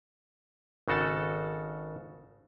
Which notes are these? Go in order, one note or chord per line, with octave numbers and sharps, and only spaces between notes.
G#1 C#3 F#4 A4 A5